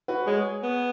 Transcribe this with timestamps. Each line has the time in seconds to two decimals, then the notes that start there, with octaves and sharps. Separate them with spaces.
0.08 F#4 B4
0.26 G#3 G#4 C#5
0.63 B3